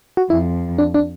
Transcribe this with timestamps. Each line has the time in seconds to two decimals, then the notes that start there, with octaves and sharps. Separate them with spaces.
0.17 F#4
0.30 F2 E4
0.78 D4
0.94 D4